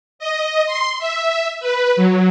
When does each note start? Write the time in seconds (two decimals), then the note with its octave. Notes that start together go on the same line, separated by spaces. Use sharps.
0.19 D#5
0.66 C6
0.99 E5
1.60 B4
1.96 F#3